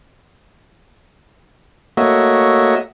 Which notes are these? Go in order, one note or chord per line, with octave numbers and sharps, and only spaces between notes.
A3 A#3 F#4 C#5 D#5 E5